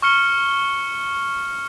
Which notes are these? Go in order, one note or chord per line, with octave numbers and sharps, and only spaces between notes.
C#6 F6 C#7 G7